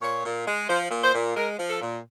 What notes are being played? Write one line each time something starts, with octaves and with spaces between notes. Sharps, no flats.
A#2 C#5
A#2
G#3
F3 C5
A#2
C5
A#2
G#3 A#4
F3
A4
A#2